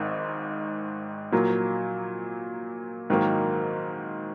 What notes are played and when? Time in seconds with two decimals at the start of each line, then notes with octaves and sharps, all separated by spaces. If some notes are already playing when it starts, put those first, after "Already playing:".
Already playing: G#1 G#2 D#3
1.32 A#2 F#3 A#3
3.10 G#2 D#3 F#3 A#3